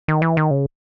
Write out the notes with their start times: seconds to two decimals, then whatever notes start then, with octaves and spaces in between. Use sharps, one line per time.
0.08 D#3
0.22 E3
0.37 D#3
0.51 C#3